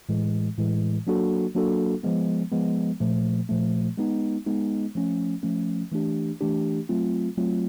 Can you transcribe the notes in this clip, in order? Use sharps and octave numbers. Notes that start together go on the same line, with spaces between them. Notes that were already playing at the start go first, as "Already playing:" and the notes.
A2 E3 G#3
A2 E3 G#3
F#3 A#3 D4 F#4 A4
F#3 A#3 D4 F#4 A4
F3 G#3 B3
F3 G#3 B3
A#2 F3 A3
A#2 F3 A3
G#3 B3 D#4
G#3 B3 D#4
F3 A3 C#4
F3 A3 C#4
E3 A3 D4 G4
E3 A3 D4 G4
F#3 A3 C4 F4
F#3 A3 C4 F4